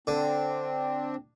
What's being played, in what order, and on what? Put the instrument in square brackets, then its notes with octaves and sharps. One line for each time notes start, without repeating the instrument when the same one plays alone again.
[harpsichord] D3 [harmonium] C4 D4